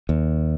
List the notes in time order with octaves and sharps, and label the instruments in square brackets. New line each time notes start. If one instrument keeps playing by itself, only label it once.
[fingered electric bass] D#2